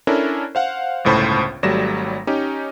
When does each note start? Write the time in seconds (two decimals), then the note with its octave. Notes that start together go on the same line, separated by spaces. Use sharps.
0.07 C#4 D4 E4 A4 A#4
0.55 C5 F5 F#5
1.04 G1 C#2 A2 C5 A5 B5
1.63 G#1 F#3 G3 A3 A#6 E7
2.27 C#4 D#4 G4